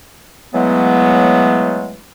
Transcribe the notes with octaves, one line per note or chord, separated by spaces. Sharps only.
C#3 E3 F#3 G#3 A3 B3